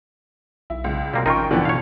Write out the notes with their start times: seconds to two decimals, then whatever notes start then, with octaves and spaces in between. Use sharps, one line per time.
0.70 B1 E4
0.84 C#2
1.14 B2 G3 A#3 C4
1.26 A1 C#4 D#4 F4 A#4 G5 C#6
1.51 D3 E3 F3 B3
1.65 B2 C#5 F5